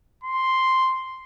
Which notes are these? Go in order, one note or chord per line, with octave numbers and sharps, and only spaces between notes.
C6